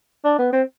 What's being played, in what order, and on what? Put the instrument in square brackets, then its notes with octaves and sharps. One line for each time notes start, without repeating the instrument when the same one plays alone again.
[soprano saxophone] D4
B3
C4